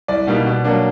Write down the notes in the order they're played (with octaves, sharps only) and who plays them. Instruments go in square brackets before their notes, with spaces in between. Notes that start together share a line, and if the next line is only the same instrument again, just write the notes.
[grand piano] C2 D5
B2 G3 A#3 D#4
B2
F#3 A#3 D4